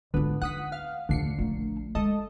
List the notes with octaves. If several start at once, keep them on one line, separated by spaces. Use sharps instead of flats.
G#1 D3 B3 F4
D#4 F#5 D#6 B6
F5
D#1 D3 A3 C7 C#7
A#1 A3 D4
G#3 A4 D#5